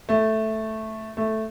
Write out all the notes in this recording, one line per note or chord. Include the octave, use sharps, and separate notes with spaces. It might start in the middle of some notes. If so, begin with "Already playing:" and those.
A3
A3